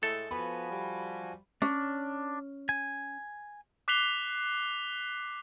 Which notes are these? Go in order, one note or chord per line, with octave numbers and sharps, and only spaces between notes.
A2 G#3 A3 A4
F3 B3 F#4 G#5 B5
G3
C#4 D4
G#5
D6 F#6 B6 C7 F7 G7